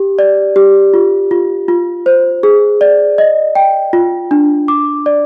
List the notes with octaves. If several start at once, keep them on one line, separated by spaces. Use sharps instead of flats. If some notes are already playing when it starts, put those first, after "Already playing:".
Already playing: G4
D5
G4
F4
F4
F4
C5
G#4
D5
D#5
G5
F4
D4
D6
D5